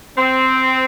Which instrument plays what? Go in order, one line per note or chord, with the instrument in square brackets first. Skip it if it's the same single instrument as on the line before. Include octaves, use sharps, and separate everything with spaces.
[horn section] C4